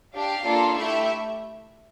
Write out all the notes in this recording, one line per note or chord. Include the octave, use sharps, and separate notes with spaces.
D4 G4 F5
A#3 D4 F4 A4
A3 E4 G4 E5